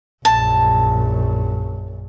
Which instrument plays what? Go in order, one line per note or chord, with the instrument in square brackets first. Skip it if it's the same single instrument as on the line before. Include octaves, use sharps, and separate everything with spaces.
[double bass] A#1 F#2 [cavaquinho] A5